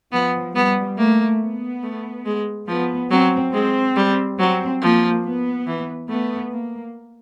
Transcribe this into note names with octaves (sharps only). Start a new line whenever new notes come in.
F3 B3
G3 B3
A3 A#3
B3
A3
G#3
F3 B3
F#3 C4
G#3 C4
G3
F#3 C4
F3 A#3
B3
E3
A3 B3
A#3